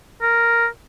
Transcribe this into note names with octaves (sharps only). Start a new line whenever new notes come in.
A#4